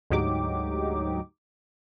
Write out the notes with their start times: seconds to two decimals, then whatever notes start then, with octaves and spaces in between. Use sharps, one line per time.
0.10 D2 G#2 F#3 D#4 G4 D6